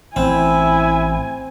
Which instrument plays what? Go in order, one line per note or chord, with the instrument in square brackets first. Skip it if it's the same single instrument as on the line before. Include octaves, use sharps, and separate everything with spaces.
[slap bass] A1 [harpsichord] C4 [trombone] E4 [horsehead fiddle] G#5